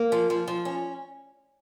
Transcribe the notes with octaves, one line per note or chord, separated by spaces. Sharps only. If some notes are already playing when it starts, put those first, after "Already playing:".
Already playing: A#3
F3
F3
F3
C#4